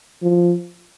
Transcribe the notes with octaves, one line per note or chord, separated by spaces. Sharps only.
F3